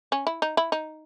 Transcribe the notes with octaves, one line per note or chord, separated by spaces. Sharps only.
C#4
E4
D#4
E4
D#4